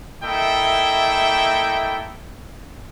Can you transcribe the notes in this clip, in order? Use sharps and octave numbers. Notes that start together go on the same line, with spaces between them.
A#3 E4 A4 D#5 E5 G5